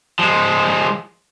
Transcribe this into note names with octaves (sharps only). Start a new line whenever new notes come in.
F3 G#3